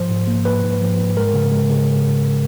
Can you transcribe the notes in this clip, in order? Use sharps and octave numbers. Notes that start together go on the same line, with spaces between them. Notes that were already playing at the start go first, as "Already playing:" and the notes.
Already playing: G#2 F3 C5
G#2
A#3
G#2 B4
G#2
F3
G#2
G#3 A#4
C#3
G#3
C#3